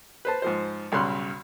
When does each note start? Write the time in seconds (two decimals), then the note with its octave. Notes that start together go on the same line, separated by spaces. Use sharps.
0.25 B4 C5 A5
0.42 G#2 F3 C5
0.92 B1 G2 C#3 C6 F#6